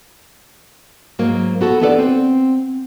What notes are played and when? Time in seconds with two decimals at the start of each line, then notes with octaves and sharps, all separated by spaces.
1.19 G#2 F#3 A#3
1.61 B3 F#4 A4
1.81 B3 D4 E4 A4 B4 D5
1.99 C4